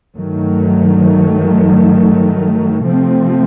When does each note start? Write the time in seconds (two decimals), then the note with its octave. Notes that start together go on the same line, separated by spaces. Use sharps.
0.16 G2 D#3 F#3 A3
2.87 C3 F3 A3 C4